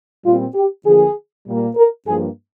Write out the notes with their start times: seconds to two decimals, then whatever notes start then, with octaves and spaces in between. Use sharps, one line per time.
0.24 A#2 G3 C4 F4
0.55 G4
0.84 D3 F3 A#3 G#4
1.46 A#2 G3 A#3
1.75 A#4
2.05 G2 F3 A#3 G#4